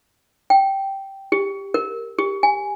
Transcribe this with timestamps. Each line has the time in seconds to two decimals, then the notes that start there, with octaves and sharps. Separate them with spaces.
0.50 G5
1.32 G4
1.74 A#4
2.19 G4
2.43 G#5